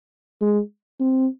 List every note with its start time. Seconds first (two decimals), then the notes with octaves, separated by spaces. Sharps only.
0.41 G#3
1.00 C4